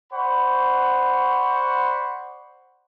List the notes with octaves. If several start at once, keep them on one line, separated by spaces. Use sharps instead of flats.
C5 D5 F#5 B5 C#6